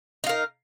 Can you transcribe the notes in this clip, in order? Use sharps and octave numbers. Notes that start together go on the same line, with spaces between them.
D#4 A#4 F5